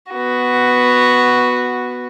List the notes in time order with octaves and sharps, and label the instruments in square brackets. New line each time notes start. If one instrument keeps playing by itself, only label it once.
[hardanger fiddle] B3 F#4